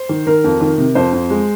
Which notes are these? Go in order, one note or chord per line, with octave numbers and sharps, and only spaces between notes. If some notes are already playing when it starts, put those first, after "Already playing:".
Already playing: C5
D#3
D#3 A#4
F2
D#3
C3
F2 C5
F2
G#3